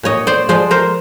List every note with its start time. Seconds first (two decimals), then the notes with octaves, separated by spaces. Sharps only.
0.03 A#2 C#5 D#5
0.27 C5 D5
0.49 F3 G#3 C5 D5
0.71 A#4 C5